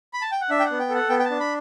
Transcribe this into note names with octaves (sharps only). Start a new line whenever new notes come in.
B5
A5
G5
F#5
D4 E5
G5
F#5
B3
G5
A4
F#5
B3 G5
G5
A5
D4
B5